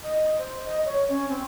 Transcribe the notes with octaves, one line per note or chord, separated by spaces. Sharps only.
D#5
C5
D#5
C#5
C#4
C4